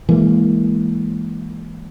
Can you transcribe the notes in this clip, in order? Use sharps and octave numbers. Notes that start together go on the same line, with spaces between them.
E3 G#3 A#3